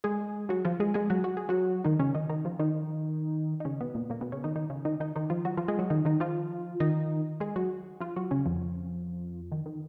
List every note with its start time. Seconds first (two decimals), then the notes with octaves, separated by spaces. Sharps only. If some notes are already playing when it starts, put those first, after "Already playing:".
0.04 G#3 G#4
0.49 F#3 F#4
0.65 F3 F4
0.80 G#3 G#4
0.94 G#3 G#4
1.10 F#3 F#4
1.24 F#4
1.37 G#4
1.49 F#3 F#4
1.84 D#3 D#4
2.00 C#3 C#4
2.15 D#3 D#4
2.29 D#3 D#4
2.45 F3 F4
2.59 D#3 D#4
3.60 D#4
3.65 C#3 C#4
3.81 B2 B3
3.95 A#2 A#3
4.10 A#2 A#3
4.21 B2 B3
4.32 C#3 C#4
4.44 D#3 D#4
4.56 D#3 D#4
4.70 C#3 C#4
4.85 D#3 D#4
5.00 D#3 D#4
5.16 D#3 D#4
5.30 F3 F4
5.45 F#3 F#4
5.57 F3 F4
5.68 G#3 G#4
5.79 F#3 F#4
5.90 D#3 D#4
6.05 D#3 D#4
6.20 F3 F4
6.80 D#3 D#4
7.40 G#3 G#4
7.56 F#3 F#4
8.00 F3 F4
8.16 F#3 F#4
8.31 C#3 C#4
8.46 F2 F3
9.52 D#3
9.66 D#3